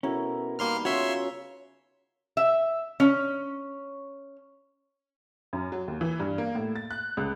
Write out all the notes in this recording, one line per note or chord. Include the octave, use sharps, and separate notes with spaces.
B2 C#4 E4 A4 A#4 C#6
D#3 G3 A#3 C6 F6
C#3 F4 F#4 C#5 E5 C6
E5
C#4
F#2
F#3
D#2
E3
G2
A#3
A2
A6
F#6
C#2